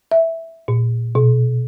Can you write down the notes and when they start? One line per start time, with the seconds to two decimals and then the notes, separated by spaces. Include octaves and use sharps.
0.11 E5
0.68 A#2
1.15 B2